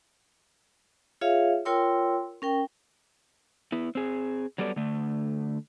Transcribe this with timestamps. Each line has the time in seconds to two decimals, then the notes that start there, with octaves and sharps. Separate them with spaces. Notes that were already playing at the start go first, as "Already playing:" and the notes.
1.21 F4 G#4 C#5 E5 F5
1.65 F4 A#4 C#5 G5 C6 E6
2.42 C#4 A#4 G5
3.72 B3 E4
3.95 C4 G#4
4.58 F#3 G3 B3 A4 D5
4.76 D3 A3